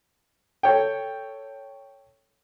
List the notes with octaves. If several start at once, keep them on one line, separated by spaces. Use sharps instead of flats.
A4 C#5 G5